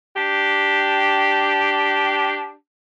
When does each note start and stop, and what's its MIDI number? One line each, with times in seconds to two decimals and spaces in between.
0.16 2.52 62
0.16 2.52 67